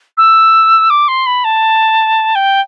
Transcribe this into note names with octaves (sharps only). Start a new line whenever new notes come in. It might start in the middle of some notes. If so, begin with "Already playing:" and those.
E6
D6
C6
B5
A5
G5